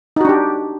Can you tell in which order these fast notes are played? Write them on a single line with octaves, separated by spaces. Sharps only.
D#4 F#4 D4 G4